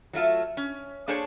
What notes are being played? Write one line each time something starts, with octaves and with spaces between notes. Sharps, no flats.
F#3 A3 F4 E5
C#4
A#3 D4 G#4 A4 C5 C#5